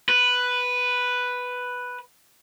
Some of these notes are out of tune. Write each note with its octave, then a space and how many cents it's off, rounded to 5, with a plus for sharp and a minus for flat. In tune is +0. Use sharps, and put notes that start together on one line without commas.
B4 +0